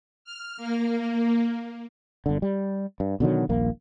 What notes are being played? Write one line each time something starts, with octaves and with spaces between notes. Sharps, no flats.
F6
A#3
G1 D3
G3
G2
B2 D3 D#3 F#3
D#1 A#1 A#3